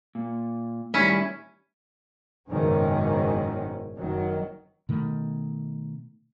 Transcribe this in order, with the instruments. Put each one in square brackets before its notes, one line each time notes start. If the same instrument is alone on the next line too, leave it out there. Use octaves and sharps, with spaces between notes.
[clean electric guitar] A#2
[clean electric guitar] A2 D#3 G3 [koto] C#4 E4
[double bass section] F#1 G#2 B2 D#3 C#4
F#1 D#3 F#3
[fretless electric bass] B2 D#3 A3